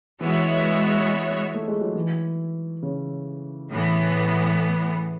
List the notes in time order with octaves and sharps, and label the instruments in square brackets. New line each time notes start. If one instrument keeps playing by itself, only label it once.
[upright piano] E3 [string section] G#3 B3 F#4 C#5 E5
[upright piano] A3
G#3
F#3
E3
C#3
[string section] A2 E3 B3